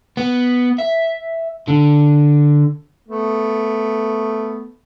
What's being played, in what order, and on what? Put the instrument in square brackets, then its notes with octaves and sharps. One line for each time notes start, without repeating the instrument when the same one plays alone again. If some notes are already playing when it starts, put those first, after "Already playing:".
[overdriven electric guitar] B3
E5
D3
[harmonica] A3 B3